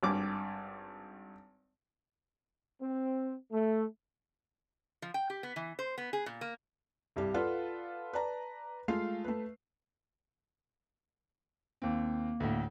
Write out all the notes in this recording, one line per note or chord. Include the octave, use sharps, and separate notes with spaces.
G#1 G2 D6
C4
A3
F3
G5
G4
B3
E3
C5
B3
G#4
A#2
A#3
C2 G2 G4
F4 A4 B4 D5 F5 F#5
B4 D5 A5 A#5
G#3 A3 F4 F5 C7
A3 B4
D#2 A#3 C4
D2 A2